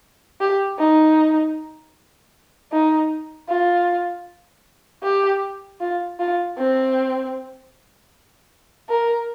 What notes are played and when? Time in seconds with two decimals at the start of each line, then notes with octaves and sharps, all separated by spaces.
0.40 G4
0.79 D#4
2.72 D#4
3.49 F4
5.03 G4
5.81 F4
6.19 F4
6.57 C4
8.89 A#4